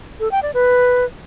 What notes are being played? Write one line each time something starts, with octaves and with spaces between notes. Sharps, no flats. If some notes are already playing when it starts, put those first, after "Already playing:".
A4
G5
D5
B4